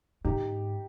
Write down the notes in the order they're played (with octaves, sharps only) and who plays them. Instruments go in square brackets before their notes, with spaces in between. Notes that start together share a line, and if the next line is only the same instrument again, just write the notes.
[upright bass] G#2 [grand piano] D#4 G4